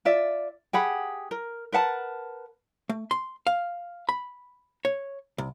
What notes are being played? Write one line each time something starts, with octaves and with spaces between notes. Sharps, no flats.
F4 D5 E5
G4 G#4 F#5 B5
A#4
A#4 B4 F#5 A5
A3
C6
F5
B5
C#5
C2